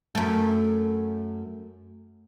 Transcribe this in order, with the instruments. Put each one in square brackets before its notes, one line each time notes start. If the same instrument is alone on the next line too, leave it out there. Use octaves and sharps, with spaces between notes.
[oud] F#2 A3